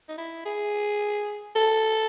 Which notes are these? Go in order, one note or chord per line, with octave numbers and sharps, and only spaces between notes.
D#4
E4
G#4
A4